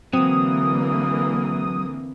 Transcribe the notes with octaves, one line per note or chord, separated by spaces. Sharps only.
D3 E3 F#3 A#3 C4 D#6